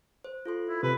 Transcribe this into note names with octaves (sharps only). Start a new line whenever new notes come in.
C5
F4 A4 C6
E4
C3 B4